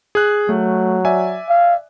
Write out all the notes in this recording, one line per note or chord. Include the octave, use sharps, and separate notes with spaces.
G#4 F#6
F#3 A3
D5 E5 G#5
F5